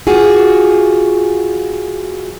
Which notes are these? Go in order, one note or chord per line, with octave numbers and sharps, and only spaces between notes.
F4 F#4 G#4